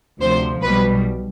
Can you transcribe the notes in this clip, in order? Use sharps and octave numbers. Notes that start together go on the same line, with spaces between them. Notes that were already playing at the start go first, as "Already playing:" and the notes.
D2 C3 F3 C5
B1 B2 G3 B4